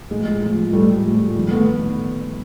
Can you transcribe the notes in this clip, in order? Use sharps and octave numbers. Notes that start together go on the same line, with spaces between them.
A2 F3 G#3
A2 F3
A2 F3 G3 A3
A2 F3
G2 D#3
A3 B3